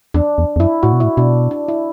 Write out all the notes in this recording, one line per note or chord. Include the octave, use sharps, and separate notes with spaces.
E2 D4
E2
E2
F#2 E4
A2 F#4
B2
A2 E4
B2 D4
D4
E4